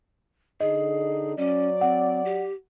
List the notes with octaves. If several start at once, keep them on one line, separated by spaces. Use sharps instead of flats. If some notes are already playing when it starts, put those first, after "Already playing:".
D3 D#4 G#4 D#5
F#3 C#4 D5
C4 F#5
G4